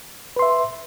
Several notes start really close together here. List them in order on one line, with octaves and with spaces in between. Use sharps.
B4 C6 E5